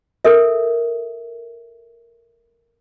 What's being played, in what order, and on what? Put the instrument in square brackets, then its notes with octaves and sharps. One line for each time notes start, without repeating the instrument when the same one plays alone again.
[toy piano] A4 A#4 E5